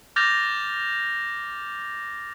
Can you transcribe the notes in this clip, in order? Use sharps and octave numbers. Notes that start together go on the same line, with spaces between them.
D6 F6 G6 A6 A#6 F7